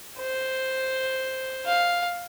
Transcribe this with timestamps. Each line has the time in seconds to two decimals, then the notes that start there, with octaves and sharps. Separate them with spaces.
0.19 C5
1.66 F5